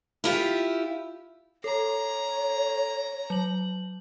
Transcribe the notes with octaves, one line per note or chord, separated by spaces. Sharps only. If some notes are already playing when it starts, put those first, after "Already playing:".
E4 F4 G4
A4 C#5 A#5
F#3 F#7